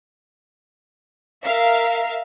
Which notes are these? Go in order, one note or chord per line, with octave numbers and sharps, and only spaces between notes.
A#4 E5 F5